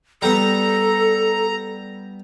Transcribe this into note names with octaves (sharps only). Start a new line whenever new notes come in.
G3 B3 A4 A#5